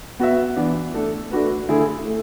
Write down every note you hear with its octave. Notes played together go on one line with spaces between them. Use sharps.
B3 F#4 B4 E5
E3 B3 D4
A3 D4 A4
A3 D4 F#4 B4
D3 A3 E4 G#4
A3